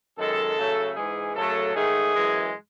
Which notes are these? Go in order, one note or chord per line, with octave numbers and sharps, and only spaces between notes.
F#2 D#3 G#3 A4
C#3 F#3 A3
G#2 E3 G#3 G#4
F#2 C#3 F#3 A3 A4
G#2 D#3 A3 G#4
F#2 E3 G#3